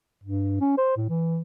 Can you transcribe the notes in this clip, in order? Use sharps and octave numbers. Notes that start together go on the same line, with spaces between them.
G2
C#4
C5
A2
E3